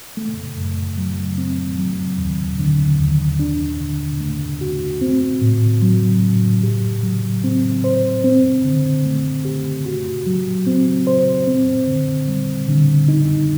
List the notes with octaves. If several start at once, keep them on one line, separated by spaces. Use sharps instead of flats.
A3
F#2
F#3
C4
F#3
D#2
D3
D#2
D4
D3
A3
F#4
C4
A2
F#3
A2
G4
F#3
C4
C5
C4
D3
A3
G4
F#4
F#3
C4
C5
C4
D3
G3
D3
D#4